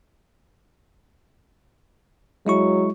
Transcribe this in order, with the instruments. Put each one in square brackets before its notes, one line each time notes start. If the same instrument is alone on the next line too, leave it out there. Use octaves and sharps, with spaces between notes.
[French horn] F#3 [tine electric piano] G#3 E4 C#6